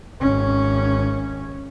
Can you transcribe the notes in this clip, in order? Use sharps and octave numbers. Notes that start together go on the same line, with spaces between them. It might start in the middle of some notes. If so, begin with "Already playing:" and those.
G#1 C#4